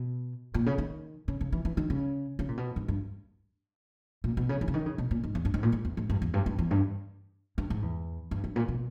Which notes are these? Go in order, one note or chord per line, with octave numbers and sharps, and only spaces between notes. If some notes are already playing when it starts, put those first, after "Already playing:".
Already playing: B2
A#2
C#3
D#3
C#3
C#3
E3
E3
D#3
C#3
C#3
A#2
B2
G#2
G2
A#2
B2
C#3
E3
C#3
D#3
C#3
B2
A#2
G#2
E2
G2
G#2
A#2
G#2
E2
G#2
G2
E2
G2
G2
E2
G2
G2
G#2
E2
G2
G2
A#2
B2